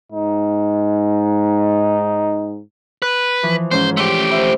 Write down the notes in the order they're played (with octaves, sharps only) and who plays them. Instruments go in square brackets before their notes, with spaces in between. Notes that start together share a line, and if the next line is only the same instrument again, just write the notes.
[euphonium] G#2 [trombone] D#4
[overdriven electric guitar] B4
[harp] E3 F3
[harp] G#2 C#4 [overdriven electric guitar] C5
[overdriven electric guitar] A3 G4 [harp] D5 G5 C6
[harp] C5 E5 B5